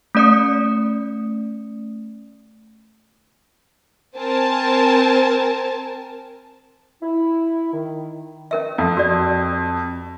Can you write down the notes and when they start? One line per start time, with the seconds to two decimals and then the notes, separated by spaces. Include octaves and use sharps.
0.15 A3 C#4 D5 D#6 C#7
4.16 C4 A#4 G#5 A5
7.03 E4
7.73 D#3
8.51 C#4 A#4 E5
8.78 F2
8.97 F#4 D5